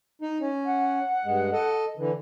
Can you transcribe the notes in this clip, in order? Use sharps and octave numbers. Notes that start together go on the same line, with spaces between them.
D#4
C#4
F#5
G2 G#3
A4 D#5
D3 E3